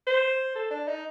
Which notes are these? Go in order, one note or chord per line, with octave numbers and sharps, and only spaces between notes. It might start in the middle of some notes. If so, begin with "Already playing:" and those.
C5
A4
D4
D#4